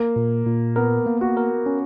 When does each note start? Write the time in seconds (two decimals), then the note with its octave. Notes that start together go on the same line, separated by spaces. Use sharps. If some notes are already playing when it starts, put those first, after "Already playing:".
Already playing: A#3
0.16 A#2
0.46 A#2
0.76 B3 A#4
1.06 A#3
1.21 F#4
1.37 A#4
1.66 C#4